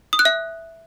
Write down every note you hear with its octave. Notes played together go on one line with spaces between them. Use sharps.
D#6
F#6
E5